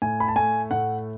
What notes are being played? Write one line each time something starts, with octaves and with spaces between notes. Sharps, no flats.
A2 G#5
B5
A5
A3 G#5
A2 F#5